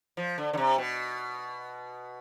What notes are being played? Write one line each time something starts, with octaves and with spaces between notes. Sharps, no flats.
F3
D3
D3
C3
B2